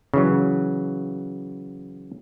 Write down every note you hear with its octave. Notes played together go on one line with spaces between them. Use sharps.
C#3 E3 F#3